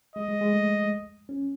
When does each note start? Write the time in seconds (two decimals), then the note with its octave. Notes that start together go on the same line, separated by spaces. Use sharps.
0.15 G#3 D#5
0.29 G#3
0.41 G#3
0.53 A3
1.29 C#4